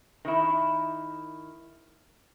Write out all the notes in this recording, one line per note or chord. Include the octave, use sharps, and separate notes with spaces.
D#3 E4